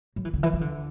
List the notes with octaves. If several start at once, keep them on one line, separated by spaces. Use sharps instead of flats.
F#3
E3
D3
E3
E3
D3